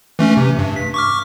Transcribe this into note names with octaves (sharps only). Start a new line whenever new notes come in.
E3 A3 C#4
C3
G2
B6
C#6 D6 F6